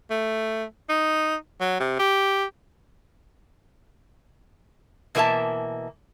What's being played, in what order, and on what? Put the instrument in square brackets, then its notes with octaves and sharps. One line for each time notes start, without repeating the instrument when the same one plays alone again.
[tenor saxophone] A3
D#4
F#3
C3
G4
[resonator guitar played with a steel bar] B2 E3 A#3 A#4 E5 A5